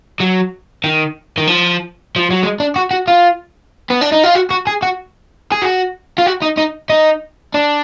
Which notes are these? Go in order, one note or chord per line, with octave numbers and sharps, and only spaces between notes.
F#3
D#3
D#3
F3
F3
F#3
G#3
D4
F#4
F#4
F4
B3
D4
D#4
F4
F#4
F#4
G#4
F#4
G#4
F#4
F4
F#4
D#4
D#4
D#4
D4